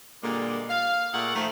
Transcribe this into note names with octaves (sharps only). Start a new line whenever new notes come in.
A#2 D3 G3 G#3 A#3
F5
A#2 A3 G#4 A#4 F#5
D#3 F3 A3